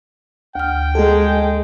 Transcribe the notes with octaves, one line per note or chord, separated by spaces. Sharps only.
D2 G5 F6
G#3 G#4 A4